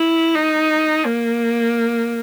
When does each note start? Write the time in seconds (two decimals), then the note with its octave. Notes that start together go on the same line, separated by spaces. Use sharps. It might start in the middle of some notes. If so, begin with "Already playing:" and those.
Already playing: E4
0.35 D#4
1.05 A#3